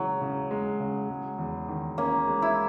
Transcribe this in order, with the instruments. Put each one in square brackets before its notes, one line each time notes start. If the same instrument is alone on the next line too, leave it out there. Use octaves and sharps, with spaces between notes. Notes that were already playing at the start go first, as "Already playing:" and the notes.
Already playing: [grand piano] C#3 E3 G#3 [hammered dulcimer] F#3
[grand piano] C#3
G#3
C#3
G#3
E2
D#3
[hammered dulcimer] A#3 [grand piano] C#4
[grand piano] G#3
[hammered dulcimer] E4